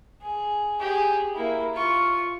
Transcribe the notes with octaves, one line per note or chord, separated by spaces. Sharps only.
G#4
G4 G#4
A#3 E4
F4 C#6